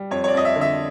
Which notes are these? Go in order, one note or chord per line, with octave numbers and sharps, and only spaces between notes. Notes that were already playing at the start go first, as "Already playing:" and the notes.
Already playing: G3
F2 C#5
C#5
D5
F2 D#5
E5
D3
E5